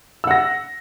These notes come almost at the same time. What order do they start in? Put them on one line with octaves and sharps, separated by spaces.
E6 F#5 A#6